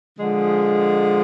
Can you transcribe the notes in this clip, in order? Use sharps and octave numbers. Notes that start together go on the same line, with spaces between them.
D3 F3 G#3